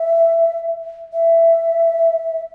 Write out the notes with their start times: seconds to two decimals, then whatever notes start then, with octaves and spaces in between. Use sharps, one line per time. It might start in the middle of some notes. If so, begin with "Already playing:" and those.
Already playing: E5
1.13 E5